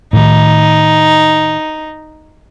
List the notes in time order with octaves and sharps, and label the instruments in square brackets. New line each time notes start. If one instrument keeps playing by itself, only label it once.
[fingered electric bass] A2 D#3 [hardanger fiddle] D#4